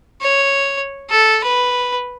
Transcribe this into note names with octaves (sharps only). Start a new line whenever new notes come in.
C#5
A4
B4